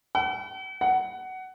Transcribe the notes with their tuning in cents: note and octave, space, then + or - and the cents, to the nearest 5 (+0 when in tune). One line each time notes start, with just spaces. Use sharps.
F#5 +45
F#5 +15